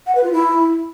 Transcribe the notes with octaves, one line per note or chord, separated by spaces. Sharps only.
F#5
B4
F4
E4